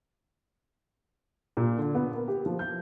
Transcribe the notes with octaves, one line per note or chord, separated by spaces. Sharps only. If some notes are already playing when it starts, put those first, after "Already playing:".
A#2
D3
B3
A#4
G4
F3
G6